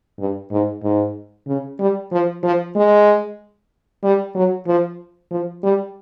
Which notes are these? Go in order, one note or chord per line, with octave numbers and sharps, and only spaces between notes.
G2
G#2
G#2
C#3
G3
F3
F3
G#3
G3
F#3
F3
F3
G3